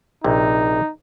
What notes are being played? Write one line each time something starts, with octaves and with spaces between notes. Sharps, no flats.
A#1 C3 D#4